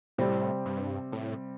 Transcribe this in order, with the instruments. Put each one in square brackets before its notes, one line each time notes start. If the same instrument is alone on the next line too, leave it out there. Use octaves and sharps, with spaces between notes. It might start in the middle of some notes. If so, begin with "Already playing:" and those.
[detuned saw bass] A2 [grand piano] C3 G3 C4 G4
[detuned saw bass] G2
A2